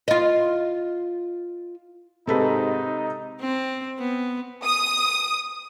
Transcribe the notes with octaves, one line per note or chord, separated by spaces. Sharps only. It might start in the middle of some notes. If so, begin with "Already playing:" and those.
F4 D#5
G#2 C3 D#4 A4 B4
C4
B3
D#6